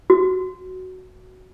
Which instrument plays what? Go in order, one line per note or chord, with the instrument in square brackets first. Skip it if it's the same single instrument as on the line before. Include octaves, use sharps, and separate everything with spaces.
[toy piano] F#4